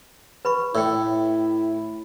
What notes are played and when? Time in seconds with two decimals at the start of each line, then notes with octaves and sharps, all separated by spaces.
0.45 B4 B5 C#6
0.75 A2 E4 G5 E6